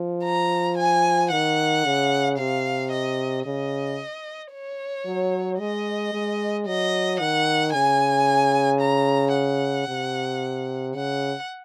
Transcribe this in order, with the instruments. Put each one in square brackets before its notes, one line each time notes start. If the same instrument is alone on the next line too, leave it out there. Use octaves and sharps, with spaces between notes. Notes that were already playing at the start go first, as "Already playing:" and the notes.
Already playing: [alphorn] F3
[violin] A#5
G#5
[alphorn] D#3 [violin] F#5
[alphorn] C#3
[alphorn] C3 [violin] F5
[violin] D#5
[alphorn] C#3 [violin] D#5
[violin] C#5
[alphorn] F#3
[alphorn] G#3 [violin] D#5
[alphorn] G#3
[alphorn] F#3 [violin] D#5
[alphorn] D#3 [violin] F#5
[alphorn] C#3 [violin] G#5
[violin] A#5
F#5
[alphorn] C3
[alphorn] C#3 [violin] F#5